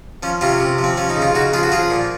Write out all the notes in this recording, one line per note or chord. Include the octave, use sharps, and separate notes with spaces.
F3 C#4
C3 C#4 F4
C3
F3
C4
F3 C#4
D#4
C#3
F4
C#3 D#4 F#4
F3 F4 G#4
F#4
F3 F4 G#4
A#2